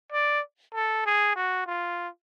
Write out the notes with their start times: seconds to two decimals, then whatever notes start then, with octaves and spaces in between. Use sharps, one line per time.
0.12 D5
0.74 A4
1.06 G#4
1.36 F#4
1.67 F4